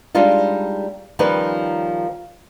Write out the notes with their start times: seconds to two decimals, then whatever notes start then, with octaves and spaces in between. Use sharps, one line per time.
0.15 G3 G#3 D4 D#4 F4
1.19 D#3 F3 G3 C#4 D#4 B4